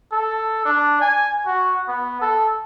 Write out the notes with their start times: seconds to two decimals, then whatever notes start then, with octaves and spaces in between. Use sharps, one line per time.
0.13 A4
0.65 D4
1.01 G#5
1.46 F#4
1.88 B3
2.21 A4